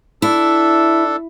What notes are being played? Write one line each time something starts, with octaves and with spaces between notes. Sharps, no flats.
D4 E4 A4